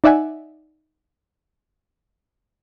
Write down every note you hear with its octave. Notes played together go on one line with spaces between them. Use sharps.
D#4 D5 E5 F#5 G#5